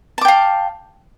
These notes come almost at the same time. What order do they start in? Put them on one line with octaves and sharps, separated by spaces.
A5 D6 G5 F5